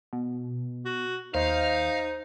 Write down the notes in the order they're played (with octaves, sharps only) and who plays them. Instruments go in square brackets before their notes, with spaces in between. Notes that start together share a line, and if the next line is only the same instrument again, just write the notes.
[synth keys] B2
[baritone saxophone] F#4
[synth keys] D#2 [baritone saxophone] D#4 [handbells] C5 D#5 [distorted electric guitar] F5